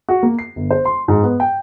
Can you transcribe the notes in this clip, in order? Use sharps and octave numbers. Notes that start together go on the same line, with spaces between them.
F#4
A#3
C7
G1
C5
C6
G#2
B3
G5